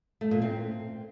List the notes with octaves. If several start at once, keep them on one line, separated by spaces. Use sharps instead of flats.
A3
A#2
C4